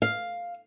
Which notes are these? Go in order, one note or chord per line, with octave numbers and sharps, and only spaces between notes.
F5